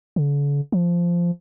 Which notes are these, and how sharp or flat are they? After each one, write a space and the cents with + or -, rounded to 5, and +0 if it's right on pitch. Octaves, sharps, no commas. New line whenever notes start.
D3 -45
F3 -10